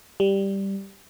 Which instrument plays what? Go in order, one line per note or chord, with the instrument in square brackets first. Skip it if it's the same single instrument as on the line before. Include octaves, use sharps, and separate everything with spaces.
[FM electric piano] G3